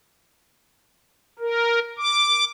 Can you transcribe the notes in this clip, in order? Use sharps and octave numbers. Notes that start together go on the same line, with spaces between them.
A#4
D6